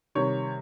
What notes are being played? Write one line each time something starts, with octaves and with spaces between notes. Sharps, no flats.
C3 D#3 G3 C#5